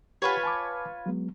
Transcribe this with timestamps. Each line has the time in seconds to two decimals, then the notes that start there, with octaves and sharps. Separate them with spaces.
0.22 F4 G4 B4 C#5 F#5 G#5
0.43 G#5 A5 D6
1.06 F#3 G#3 B3